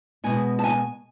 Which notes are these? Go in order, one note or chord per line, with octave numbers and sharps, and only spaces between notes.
B2 G#3 B3 G#5
A5
G#5